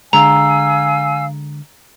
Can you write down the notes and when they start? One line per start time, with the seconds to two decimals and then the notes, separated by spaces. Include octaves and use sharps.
0.13 D3 G#3 F5 G#5 A#5 E6